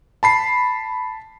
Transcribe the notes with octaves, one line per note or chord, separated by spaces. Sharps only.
A5 B5 C7